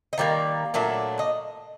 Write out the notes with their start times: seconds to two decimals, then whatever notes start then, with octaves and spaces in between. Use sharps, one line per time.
0.13 D#5
0.18 D#3 G3 A#3 D5
0.74 A#2 F#3 A3 D4
1.19 D#5